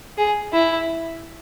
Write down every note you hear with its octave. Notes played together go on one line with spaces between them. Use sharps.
G#4
E4